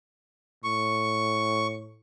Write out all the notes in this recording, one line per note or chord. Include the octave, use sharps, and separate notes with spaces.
A2 C#6